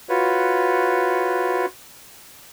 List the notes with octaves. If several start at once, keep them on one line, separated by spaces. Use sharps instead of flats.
F4 F#4 B4 C#5